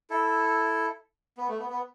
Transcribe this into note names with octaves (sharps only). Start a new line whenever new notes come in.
E4 A4
B3
A3
B3
B3